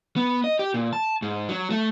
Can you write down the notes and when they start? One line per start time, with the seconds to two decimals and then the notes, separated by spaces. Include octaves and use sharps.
0.16 B3
0.44 D#5
0.59 G4
0.74 A#2
0.93 A5
1.22 G#2
1.49 F#3
1.70 A3